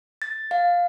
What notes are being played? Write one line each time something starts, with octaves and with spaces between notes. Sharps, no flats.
A6
F5